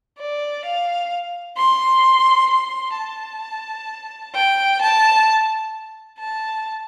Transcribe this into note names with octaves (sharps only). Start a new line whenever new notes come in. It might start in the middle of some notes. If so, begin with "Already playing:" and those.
D5
F5
C6
C6
A5
G5
A5
A5